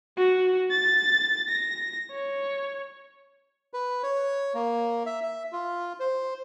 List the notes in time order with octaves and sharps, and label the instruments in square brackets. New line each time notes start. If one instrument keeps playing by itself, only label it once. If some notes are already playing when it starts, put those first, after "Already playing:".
[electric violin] F#4
A6
A#6
C#5
[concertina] B4
C#5
A#3
E5
E5
F4
C5